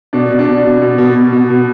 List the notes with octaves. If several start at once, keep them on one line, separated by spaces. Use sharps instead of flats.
B2 D4
B2
D4
B2
B2
B2
B2
B2
B2
B2